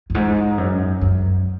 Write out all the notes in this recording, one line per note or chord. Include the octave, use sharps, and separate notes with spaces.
F#2
G#2
F#2
F#2